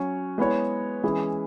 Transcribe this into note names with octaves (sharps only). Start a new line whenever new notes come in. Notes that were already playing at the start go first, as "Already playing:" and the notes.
Already playing: F#3 C#4 F#4 C#5
G#3 B3 E4 G#4 C#5
E3 G#3 C#4 E4 G#4